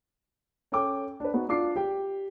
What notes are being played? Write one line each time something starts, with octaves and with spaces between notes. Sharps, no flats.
C#4 A4 G5 D6
D4 B4
B3 D#4 F#4
D4 F4 D6 C7
G4 G5